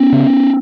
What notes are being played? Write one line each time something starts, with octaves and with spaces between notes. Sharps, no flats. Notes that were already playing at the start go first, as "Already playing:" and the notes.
Already playing: B3 C#4
C#3